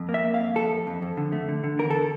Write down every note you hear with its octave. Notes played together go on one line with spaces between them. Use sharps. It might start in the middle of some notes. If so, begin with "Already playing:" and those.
Already playing: F2
A#3
E5
A#3
F5
F2
F2 A4
F2
F2
F2
D3
A3
D3
D3
E2 A#4
D3 A4